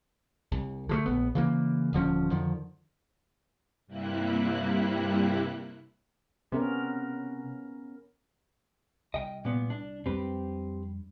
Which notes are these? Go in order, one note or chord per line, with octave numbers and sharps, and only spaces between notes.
C2
D3 F3 A3
A#1 B3
C#3 E3 A#3
D#1 D3 F3 C#4
F2 D3 D#3 F3
G2 C3 G3 A#3 E4 F#6
C3 B3 C#4 A#4
C2 D#5 G5
A#2 B3
D4
F2 G3 C4 D4 G4 B4